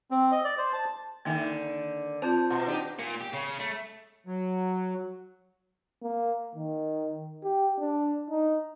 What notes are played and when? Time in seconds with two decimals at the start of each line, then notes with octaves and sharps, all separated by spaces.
0.11 C4
0.32 D#5
0.44 D5
0.58 C5
0.73 A5
1.25 D3 D#3 A#3 E5 G#5
2.22 C4 F4 C5 A5 G6
2.50 B2 F#5
2.67 D4 D#4 G4
2.99 A#2
3.21 G4
3.33 C#3
3.59 A3
4.26 F#3
6.03 A#3
6.55 D#3
7.44 G4
7.79 D4
8.30 D#4